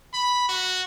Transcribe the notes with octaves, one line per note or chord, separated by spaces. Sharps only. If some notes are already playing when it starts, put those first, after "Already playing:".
B5
F#4